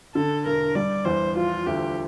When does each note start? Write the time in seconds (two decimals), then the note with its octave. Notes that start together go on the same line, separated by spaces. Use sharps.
0.15 D3 A4
0.46 E1 A#4
0.75 G3 D5
1.05 E2 C5
1.36 F3 F4
1.66 D2 G4